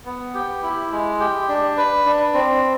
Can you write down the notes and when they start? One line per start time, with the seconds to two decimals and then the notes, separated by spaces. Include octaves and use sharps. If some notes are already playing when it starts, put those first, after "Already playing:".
0.06 B3
0.34 G4
0.63 E4
0.92 G#3
1.20 G4
1.49 D4
1.77 B4
2.06 D4
2.34 C4